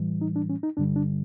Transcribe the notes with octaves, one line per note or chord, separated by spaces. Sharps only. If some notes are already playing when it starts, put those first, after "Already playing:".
Already playing: A2 E3 G3
D#4
D4
C#4
D#4
G2 D3 G3 D4
D4